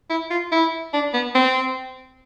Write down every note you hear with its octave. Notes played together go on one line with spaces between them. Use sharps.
E4
F4
E4
D4
B3
C4